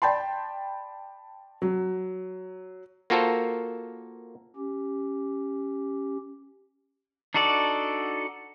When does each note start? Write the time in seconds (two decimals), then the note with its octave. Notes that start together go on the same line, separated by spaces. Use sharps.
0.02 D5 G5 A5 B5 C6
1.62 F#3
3.10 A#3 F4 F#4 A4 A#4 C5
4.56 C#4 G4
7.34 D4 D#4 F#4 A4 D5